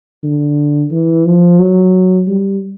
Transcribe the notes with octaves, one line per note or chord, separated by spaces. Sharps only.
D3
E3
F3
F#3
G3